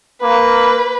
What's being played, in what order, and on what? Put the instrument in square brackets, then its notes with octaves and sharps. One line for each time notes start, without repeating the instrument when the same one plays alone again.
[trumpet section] A#3 [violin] B4